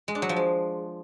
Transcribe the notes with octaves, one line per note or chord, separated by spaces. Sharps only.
G#3
D4
F#3
F3
G#3